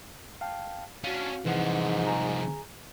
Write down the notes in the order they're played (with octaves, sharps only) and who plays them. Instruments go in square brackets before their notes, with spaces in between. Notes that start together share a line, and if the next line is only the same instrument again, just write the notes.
[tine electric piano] F5 G5 A5
[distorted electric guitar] C#4 D4 [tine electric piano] F#4 F5
[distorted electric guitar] C2 F3 [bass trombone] G#2 [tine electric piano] E3 F#5
[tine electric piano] G#4 G#5 A#5